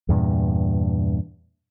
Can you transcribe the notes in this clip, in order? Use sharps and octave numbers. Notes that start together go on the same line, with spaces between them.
E2 G2 A#2